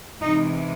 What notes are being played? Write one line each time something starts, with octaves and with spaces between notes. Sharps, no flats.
C3 E3 G#3 D#4